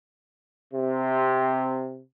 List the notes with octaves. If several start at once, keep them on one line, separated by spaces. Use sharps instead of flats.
C3